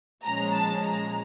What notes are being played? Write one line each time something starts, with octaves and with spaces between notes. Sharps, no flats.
A#2 F3 G#3 C#4 A#5
A5
A#5